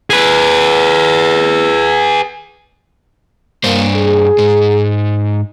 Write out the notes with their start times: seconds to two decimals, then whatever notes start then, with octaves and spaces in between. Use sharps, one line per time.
0.10 G#4 B4
3.64 G2 A#3 C5
3.95 G#4
4.38 G#2